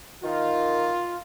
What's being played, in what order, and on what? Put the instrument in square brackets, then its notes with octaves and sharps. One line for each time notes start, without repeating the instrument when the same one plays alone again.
[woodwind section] D#3 [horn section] F4